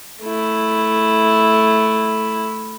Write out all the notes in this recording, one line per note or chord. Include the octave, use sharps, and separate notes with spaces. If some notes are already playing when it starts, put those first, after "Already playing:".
A3 E4